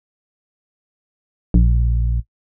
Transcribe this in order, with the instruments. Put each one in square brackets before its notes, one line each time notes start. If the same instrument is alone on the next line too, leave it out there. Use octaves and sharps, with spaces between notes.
[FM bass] A#1